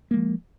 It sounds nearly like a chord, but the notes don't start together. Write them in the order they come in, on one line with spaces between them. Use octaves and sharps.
A#3 G#3 F3